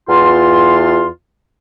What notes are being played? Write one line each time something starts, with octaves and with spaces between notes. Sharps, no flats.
E2 F4 C6